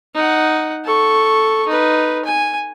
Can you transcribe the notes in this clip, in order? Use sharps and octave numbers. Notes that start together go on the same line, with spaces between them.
D#4 F#5
A4 C#6
D#4 B4
G#5